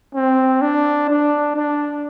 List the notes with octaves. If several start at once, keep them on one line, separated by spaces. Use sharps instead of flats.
C4
D4
D4
D4